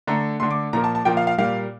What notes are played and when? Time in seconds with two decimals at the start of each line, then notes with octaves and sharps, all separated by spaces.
0.07 D3 A3 A#5
0.40 D3 A3 C6
0.51 D6
0.73 A#2 F3 A#3 A#5
0.84 A5
0.95 A5
1.05 A#2 F3 A#3 G5
1.17 F5
1.27 F5
1.38 A#2 G3 A#3 F5